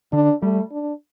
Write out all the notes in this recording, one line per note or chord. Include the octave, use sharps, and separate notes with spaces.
D3 D4
G3 A3
D4